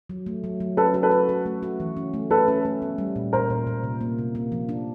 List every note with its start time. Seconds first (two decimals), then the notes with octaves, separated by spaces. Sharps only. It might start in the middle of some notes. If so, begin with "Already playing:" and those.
0.10 F#3
0.26 A3
0.44 F#3
0.60 F#3
0.77 C#4 A4 B4
0.94 F#4
1.03 A4 B4
1.11 F#4
1.29 F#4
1.46 A3
1.63 F#4
1.80 E3
1.97 C#4
2.14 A3
2.30 A3 A4 B4
2.48 C#4
2.65 A3
2.82 B3
2.98 G3
3.16 A#2
3.33 A#2 A#4 C5
3.50 A#2
3.67 A#2
3.84 C3
4.01 A#3
4.18 C3
4.35 A#3
4.52 F3
4.69 D4